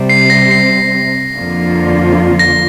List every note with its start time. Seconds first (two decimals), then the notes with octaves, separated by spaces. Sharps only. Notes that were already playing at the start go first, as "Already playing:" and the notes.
Already playing: C3 G3 C4
0.09 C7
0.30 A#6
0.51 C7
1.35 F2 D3 F3 A#3 F4
2.39 A#6